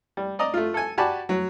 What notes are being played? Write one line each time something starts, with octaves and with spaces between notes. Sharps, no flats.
G3
D5 D#5 A#5 D#6
A3 F4
A4 G#5
F#4 G4 D5 G#5 A5 B5
F#3